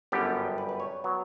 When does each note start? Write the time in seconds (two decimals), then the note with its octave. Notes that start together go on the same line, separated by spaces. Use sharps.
0.12 G1 F#2 D3 G3 B3 G4
0.58 B4
0.69 B4
0.80 C#5
1.04 F#3 B3